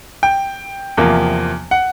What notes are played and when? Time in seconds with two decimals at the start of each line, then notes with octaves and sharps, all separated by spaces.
0.23 G5
0.97 E2 C3 F3 A#3
1.71 F#5